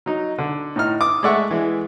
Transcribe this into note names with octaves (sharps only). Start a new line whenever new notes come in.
F#3 D#4
D3
A2 D#4 F6
D6 D#6
G#3 A3 D5 E5 F#5 C#6
E3 G#3